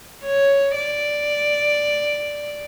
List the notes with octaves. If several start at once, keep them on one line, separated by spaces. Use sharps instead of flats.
C#5
D5